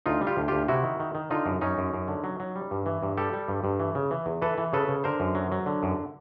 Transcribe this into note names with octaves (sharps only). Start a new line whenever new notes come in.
D2 D#4 F4
G3
F4 G4
D2
D2 F4 G4
C3 E4 F#4
D#3
D#3
D#3
D3 D#4 F4
F#2
F#2 C#4 D#4
F#2
F#2
D3
F#3
F#3
G3
G2
E3
G2
G3 G4 A4
G3
G2
G2
E3
C#3
E3
E2
E3 A4 B4
E3
C#3 A4 B4
C#3
D3 A#4 C5
F#2
F#3
F#3
D3
F#2